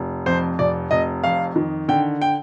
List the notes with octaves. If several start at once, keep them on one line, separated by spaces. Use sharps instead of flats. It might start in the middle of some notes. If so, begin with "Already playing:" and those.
Already playing: F1
F2 C5
F1 D5
F1 D#5
F2 F5
D#3
D3 G5
G5